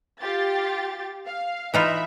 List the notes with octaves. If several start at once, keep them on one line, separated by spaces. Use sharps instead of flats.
F4 G4 A6
F5
E3 D#4 F4 E5 B5